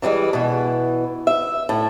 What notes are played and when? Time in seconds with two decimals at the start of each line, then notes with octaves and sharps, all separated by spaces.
0.02 E3 F3 G3 G#3
0.33 B2 E3
1.27 E5
1.69 A2